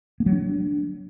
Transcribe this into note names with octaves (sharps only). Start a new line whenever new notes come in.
A#3
F#3
D4